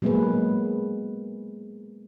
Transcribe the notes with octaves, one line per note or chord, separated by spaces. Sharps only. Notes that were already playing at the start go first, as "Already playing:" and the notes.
F#3 G#3 A#3 B3 G#4 B4